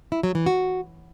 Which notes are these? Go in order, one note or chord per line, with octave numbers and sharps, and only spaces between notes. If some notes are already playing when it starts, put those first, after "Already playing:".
E4
F#3
E3
F#4